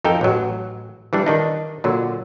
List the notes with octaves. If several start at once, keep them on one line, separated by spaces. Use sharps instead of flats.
F2 D#4 A4 A#4 G5
A1 F#3
E3 G3 D4
D#3 D4 D#4
A#2 D3 F#3